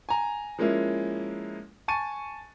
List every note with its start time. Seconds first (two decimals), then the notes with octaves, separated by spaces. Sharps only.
0.09 G#5 A#5
0.59 F3 G#3 A#3 C#4 E4
1.88 G#5 A5 C#6 A6 D#7